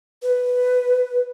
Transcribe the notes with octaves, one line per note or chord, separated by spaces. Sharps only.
B4